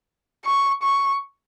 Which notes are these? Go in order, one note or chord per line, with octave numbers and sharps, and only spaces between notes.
C#6
C#6